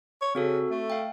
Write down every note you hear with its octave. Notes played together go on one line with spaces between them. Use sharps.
C#5
C#3 C4 F#4 A4
A3
F5 G5